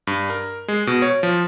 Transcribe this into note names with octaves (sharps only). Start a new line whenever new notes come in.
G2
A#4
G#3
B2
C#5
F3